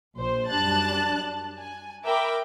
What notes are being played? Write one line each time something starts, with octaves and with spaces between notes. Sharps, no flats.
A#1 C5
F#2 G3 D4 A5 F#6 A6
G#5
A#4 E5 G5 B5 D6